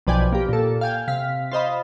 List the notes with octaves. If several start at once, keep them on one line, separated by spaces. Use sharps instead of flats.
B1 F3 B4 D5 G5 G#5
A#3 G4
A#2 A4
F5 G5 G#5
C3 F5 B6
F4 C5 D#5 B5